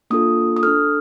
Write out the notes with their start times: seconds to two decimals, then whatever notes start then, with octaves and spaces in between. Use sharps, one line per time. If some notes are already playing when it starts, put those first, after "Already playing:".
0.10 A#3 D4 F4 A4 D#6
0.57 D#6
0.63 D4 A4 F6